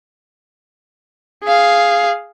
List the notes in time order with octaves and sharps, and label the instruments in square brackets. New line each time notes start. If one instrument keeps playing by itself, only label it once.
[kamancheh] G#4 F5